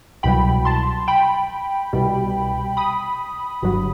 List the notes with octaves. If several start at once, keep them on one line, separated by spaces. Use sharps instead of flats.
C2 B2 F#3 G5 B5
A5 C6
G5 B5
C2 B2 G3
B5 D#6
G1 G2 F#3